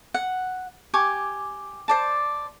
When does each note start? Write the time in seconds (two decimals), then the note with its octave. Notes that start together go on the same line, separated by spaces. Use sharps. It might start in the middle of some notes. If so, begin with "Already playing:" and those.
0.14 F#5
0.94 G4 G#5 C#6 D6
1.88 C5 D5 A5